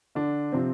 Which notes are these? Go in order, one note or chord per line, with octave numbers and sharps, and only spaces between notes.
D3 D4
C3 F3 C4